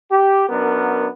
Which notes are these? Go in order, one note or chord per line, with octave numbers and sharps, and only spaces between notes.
G4
F#2 B3 D4 A#4